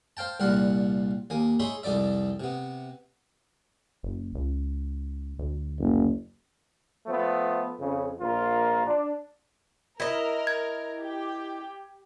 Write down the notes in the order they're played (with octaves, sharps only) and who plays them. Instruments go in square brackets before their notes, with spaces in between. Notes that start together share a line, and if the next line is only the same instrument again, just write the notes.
[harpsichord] C5 F5 G5 A5
C2 A#2 G3 F4 F5 F#5
D#2 A#3 G#5
D#4 G#4 C#5 E5 B5 C6
C2 F2 D#4 D5 E5
C3 B3
[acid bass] F#1
C#2
D2
[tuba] F#1
[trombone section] F3 A3 B3
F2 C#3
A#1 F4 A#4
D4
[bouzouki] E4 D#5 [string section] A#4
[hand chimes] G#6
[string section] G4